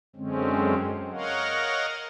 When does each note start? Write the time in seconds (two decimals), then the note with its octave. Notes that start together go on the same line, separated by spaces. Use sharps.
0.16 F#2 D3 G#3 C4 C#4
1.12 A#4 C#5 D#5 F5 F#5